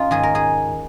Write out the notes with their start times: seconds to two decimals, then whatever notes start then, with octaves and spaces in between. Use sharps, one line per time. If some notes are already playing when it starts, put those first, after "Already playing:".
Already playing: C#4 D#4 F4
0.11 G#2 D#3 G#4
0.23 A#4
0.35 G#4